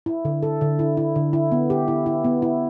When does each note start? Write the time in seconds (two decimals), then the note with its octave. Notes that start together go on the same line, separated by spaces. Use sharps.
0.06 E4
0.25 D3
0.43 A4
0.61 D3
0.79 E4
0.97 E4
1.16 D3
1.33 E4
1.52 B3
1.70 G4
1.88 E4
2.06 E4
2.24 B3
2.42 E4